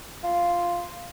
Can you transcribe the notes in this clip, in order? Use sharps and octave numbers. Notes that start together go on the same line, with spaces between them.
F4